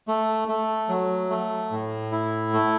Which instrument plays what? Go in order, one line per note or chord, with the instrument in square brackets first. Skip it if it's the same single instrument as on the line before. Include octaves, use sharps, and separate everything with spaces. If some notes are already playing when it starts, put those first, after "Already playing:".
[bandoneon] A3
A3
F#3
A3
A2
E4
A3